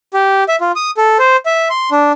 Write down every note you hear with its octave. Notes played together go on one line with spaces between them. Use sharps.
G4
E5
F4
D#6
A4
C5
E5
C6
D4